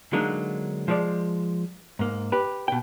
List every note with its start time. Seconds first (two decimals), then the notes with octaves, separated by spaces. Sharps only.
0.13 D3 F#3 G#3 A#3 D4 D#4
0.88 F3 G#3 D5
1.99 G#2 A#3
2.32 G4 B4
2.68 B2 G5